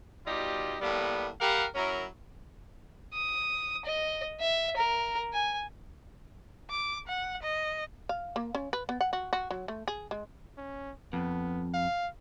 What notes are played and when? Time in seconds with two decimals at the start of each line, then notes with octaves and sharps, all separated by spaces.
0.27 B2 G3 D#4 F4 G4
0.81 A2 G3 A#3 B3
1.40 G3 G4 A#4 F5 F#5
1.75 F#3 C#4 E4 A#4
3.14 D#6
3.86 D#5
4.41 E5
4.77 A#4
5.34 G#5
6.70 D6
7.08 F#5
7.43 D#5
8.09 F5
8.36 A#3
8.55 C#4
8.73 B4
8.89 B3
9.01 F#5
9.13 F#4
9.33 F#4
9.51 F#3
9.68 A3
9.88 G#4
10.11 G#3
10.58 C#4
11.13 F2 B3
11.74 F5